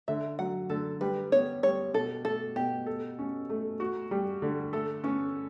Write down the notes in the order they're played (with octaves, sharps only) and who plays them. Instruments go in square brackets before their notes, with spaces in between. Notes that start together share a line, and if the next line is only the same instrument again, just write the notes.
[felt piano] D3 [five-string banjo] E5
[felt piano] F#3 [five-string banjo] F#5
[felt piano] D3 [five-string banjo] A4
[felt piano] G3 [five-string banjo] B4
[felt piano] B3 [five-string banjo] C#5
[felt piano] G3 [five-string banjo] C#5
[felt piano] B2 [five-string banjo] A4
[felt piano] A3 [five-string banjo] A4
[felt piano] B2 [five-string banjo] G4
[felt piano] A4
C#4
A3
F#4
G3
D3
[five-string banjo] A3 [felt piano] A4
[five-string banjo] B3 [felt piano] C#4